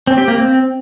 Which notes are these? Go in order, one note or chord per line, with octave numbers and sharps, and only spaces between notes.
C4
G4
A#3
C4